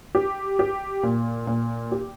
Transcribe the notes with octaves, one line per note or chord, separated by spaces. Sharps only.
G4
G4
A#2
A#2
G4